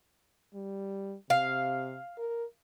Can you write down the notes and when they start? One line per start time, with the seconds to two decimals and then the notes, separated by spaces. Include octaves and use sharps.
0.54 G3
1.30 C3 F5
2.18 A#4